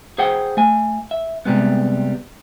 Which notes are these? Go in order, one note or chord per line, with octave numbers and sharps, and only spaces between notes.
G#4 C5 F#5 G5
A3 G#5
E5
C3 G3 G#3 B3